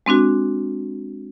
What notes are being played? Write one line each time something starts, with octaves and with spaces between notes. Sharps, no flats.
G#3 C4 D4 F#4